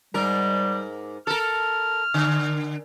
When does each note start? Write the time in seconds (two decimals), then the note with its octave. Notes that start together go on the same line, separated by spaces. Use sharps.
0.14 G#2 G3 A#4
1.27 A4 A#4 F6
2.14 D3